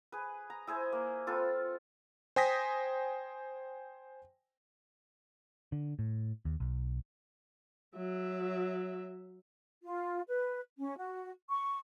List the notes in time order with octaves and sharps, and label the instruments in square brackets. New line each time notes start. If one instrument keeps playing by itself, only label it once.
[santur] G#4 B4
A#5
E4 G#4 C5 E5
A#3
C4 F4 A4 B4
[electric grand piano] C5 G5 G#5 D#6 A#6 B6
[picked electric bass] D3
A2
D#2
B1
[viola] F#3 E5
[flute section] F4
B4
C#4
F#4
C#6